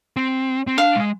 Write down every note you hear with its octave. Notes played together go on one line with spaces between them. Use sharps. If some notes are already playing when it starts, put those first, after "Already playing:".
C4
C4
D4 F5
G#3